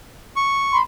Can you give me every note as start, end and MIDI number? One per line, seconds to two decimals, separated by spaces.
0.36 0.77 85
0.72 0.82 83
0.72 0.82 84